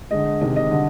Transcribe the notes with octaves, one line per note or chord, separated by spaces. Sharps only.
D3 G#3 D#5
C3 D#3 G#3 D#5
D#5
D3 G3